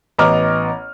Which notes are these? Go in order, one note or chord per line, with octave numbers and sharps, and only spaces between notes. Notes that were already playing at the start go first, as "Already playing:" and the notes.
A1 B3 D#5 A#5 D6 F6